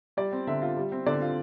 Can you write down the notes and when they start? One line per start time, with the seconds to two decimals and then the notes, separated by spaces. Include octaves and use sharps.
0.17 G3 D5
0.32 C4
0.47 D3 E5
0.62 F4
0.77 G3
0.92 C4
1.06 D3 D5
1.22 F4